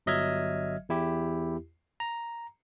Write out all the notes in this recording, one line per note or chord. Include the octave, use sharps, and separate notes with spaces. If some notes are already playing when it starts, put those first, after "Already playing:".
G1 F#3 D#5 E5 F6 G#6
E2 E4 G4
A#5